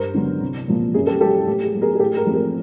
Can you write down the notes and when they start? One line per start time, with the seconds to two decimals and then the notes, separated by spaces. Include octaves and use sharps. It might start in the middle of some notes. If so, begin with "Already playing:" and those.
Already playing: G2 A#4 C5
0.14 D3 F#3 B3
0.41 C2
0.68 A#2 F3 A#3
0.94 F#2 G#4
1.07 G4 A4
1.20 C#3 F#3 G4 A4
1.46 A2 G4
1.65 G#4
1.74 F#3 B3
1.82 G#4 A#4
1.95 G#4
1.99 A2 G4 A4
2.17 G#4 A#4
2.27 F3 A3 C4
2.35 G#4 A#4